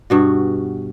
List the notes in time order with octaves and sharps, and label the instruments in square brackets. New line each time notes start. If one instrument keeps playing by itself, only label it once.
[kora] G2 B2 F#4